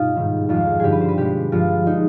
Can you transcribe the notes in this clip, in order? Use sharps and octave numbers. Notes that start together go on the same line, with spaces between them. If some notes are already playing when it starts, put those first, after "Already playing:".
Already playing: G2 B2 D#4 F4
G#2 D#3 G3
F2 D#3 G#3 F4
G2 D3 G3 G4 G#4
B4
C5
B4
B2 G#3 G4
G2 F3 G#3 F4
F3 G#3 D#4